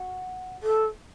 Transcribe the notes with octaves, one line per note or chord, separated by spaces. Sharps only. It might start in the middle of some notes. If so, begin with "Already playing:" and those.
Already playing: F#4
A4